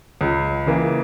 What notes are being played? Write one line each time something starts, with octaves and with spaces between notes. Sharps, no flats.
C#2
C#3 E3 A#3